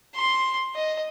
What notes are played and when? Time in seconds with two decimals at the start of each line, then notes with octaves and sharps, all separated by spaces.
0.16 C6
0.75 D#5